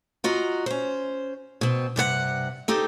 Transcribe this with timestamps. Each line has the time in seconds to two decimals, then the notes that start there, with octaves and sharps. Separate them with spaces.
0.24 F4 F#4 D#5 A#5
0.66 C#4 C5
1.61 B2 C4
1.96 G2 C3 A4 F#5
2.68 C4 D#4 G4 A4